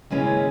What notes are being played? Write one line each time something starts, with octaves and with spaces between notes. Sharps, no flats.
D#2 C#3 G#3 C#4 E4 B4